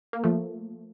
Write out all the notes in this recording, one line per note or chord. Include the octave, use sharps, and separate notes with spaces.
A#3
F3 A3